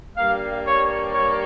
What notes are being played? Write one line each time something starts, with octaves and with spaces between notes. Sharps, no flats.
G2 G3 A#3 F5
C#5
C#5